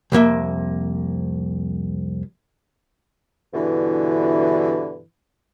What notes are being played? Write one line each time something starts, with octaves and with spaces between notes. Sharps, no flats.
C2 F2 A#3 E5
G2 B2 D3 E3